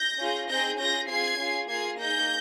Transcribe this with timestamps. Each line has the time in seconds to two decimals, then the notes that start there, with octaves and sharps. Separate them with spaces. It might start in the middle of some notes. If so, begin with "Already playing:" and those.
Already playing: G6 A#6
0.19 C#4 F4 G#4
0.49 C4 D#4 G#4 G6 A#6
0.79 C#4 F4 G#4 G6 A#6
1.09 C4 F4 G#4 G#6 C7
1.39 C#4 F4 G#4
1.69 A#3 F4 G#4 G#6 C7
1.99 A#3 D#4 G#4 G6 A#6